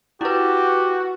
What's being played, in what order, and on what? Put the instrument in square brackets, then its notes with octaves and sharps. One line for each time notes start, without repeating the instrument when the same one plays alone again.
[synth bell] E4 B4 [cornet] F#4 [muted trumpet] G4